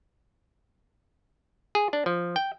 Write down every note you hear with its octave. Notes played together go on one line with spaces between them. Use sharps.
G#4
D4
F3
G5